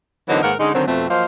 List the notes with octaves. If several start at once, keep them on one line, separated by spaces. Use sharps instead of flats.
D3 E3 F#3 A#3 C4 D#4
G#2 D#3 A#3 A#4 B4 F#5
D3 G#3 C#4 D#4
D3 D#3 F#3 C4
F2 B2 A3 C4
F3 F#3 A#3 F4 C5 D#5